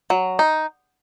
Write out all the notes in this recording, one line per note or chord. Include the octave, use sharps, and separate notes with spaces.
F#3
D#4